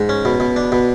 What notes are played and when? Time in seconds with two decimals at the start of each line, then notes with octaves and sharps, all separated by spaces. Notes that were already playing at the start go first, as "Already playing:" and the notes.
Already playing: G#2
0.09 C#4
0.25 B2
0.40 B2
0.56 D4
0.72 B2